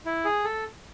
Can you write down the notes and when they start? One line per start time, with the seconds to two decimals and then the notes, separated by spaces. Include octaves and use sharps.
0.06 E4
0.25 G#4
0.44 A4